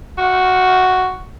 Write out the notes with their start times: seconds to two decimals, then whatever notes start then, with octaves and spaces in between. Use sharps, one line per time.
0.18 F#4